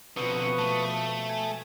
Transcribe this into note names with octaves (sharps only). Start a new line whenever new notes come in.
B2 D3 F3 C4 B4 C#6 D#6
A3
G#5